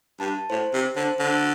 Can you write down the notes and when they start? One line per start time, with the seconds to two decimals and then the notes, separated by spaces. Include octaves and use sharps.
0.20 G2 A5
0.50 A2 C5
0.74 C3
0.96 D3 C5
1.19 D3